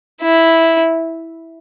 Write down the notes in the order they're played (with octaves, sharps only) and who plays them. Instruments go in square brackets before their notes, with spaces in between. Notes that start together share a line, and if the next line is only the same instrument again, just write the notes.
[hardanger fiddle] E4